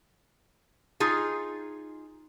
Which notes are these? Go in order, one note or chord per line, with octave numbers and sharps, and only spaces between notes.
D#4 F4 G#4